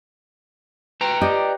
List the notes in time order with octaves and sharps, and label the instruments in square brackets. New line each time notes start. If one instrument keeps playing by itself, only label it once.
[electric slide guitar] B4 G5 A#5
[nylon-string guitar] G4 D5 D#5